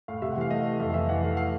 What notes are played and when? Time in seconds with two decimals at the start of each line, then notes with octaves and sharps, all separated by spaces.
0.08 A2 F5
0.22 C3 E5
0.32 F#5
0.37 E3 F5
0.51 A3 D#5
0.65 A3
0.80 F2 E5
0.89 F5
0.94 E3 E5
1.09 E3 F#5
1.24 A3 F5
1.37 F5